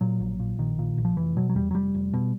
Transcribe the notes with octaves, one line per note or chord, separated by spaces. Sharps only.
A#2 F#3
A#1
A#2
A#1 D#3
A#2
A#1
F3
F1 E3
B2 F#3
F#3
E2 G3
F#3
F1 G3
F1
B2